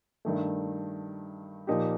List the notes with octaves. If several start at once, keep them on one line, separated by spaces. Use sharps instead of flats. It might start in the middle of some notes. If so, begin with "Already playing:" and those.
G2 D#3 A3
A#2 F3 A#3 D#4 G4